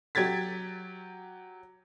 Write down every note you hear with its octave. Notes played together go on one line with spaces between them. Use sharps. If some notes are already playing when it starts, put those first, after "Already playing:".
F#3 G4 G#6 A6 B6